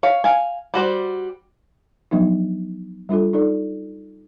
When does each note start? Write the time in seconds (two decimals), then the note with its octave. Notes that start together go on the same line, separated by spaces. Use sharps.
0.03 C#5 F5
0.24 F5 G#5
0.74 G3 F#4 C5 D5
2.11 F3 F#3 B3 D4 D#4
3.09 G3 D4 F4 A4
3.33 D#4 A4 D5